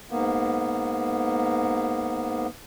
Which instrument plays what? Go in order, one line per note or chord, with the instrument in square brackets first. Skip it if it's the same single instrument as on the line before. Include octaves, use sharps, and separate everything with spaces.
[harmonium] G#2 A#3 B3